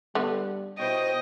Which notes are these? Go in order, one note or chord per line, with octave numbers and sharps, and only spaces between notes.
D3 G3 B3
B2 E4 C5 C#5 D#5 G5